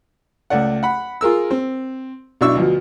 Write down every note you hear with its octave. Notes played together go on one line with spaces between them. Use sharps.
C#2 A3 D5 F#5
F#5 B5
F4 G#4 A#4 E6
C4
B1 B2 D4 E4 C#6 E6
D2 B2 F3